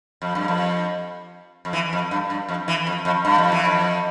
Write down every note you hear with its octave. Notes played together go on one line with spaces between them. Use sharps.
F2
G2
F2
F2
E3
F2
G2
G2
F2
E3
F2
F2
G2
F2
E3
F2